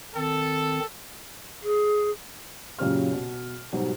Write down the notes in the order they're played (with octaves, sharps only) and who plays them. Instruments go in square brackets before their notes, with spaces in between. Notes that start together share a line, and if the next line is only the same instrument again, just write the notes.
[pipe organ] D#3 C4 [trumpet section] A4
[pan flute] G#4
[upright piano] F#2 A#2 C#3 C#4 G4 F6
B2
G#2 B2 F#3 G3